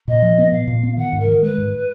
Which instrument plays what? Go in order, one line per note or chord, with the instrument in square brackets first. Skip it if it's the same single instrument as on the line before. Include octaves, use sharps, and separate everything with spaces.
[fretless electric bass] A#2 [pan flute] D#5
[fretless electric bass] F3
B3
[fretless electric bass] A#2 [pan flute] F5
[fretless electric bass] A#2
B3
[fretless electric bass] D#3 [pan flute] F#5
[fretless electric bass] G#2
[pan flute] A#4
[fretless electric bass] D#3
[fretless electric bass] G#3 [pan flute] B4
[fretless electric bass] G#2